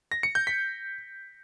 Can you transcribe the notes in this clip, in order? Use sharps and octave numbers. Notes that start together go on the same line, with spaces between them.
A#6
C#7
G6
B6